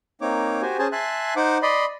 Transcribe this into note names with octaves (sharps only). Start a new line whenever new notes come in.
A#3 C4 D#4 C#5 D6
F#4 G4 C5 G#5
C#4 G#4 C5 G#5 A5
E5 G#5 A5 C6 F#6
D#4 C5 F#5 D6
D5 D#5 B5 C6